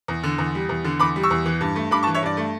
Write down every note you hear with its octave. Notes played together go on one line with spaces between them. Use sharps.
E2
D3
E2
G3
E2
D3
E2 B5 D6
G3
C#6 E6
E2
E3
G2
A3
G2 B5 D6
A5 C#6
E3
C#5 E5
G2 D5
A3